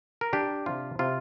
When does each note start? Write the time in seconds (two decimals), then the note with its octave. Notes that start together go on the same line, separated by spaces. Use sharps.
0.21 A#4
0.33 D4 G4
0.66 C3 F4
0.99 C3 F4